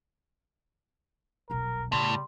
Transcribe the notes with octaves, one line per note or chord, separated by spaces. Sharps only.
D#1 B1 A#4
A2 C#3 G3 B3 C6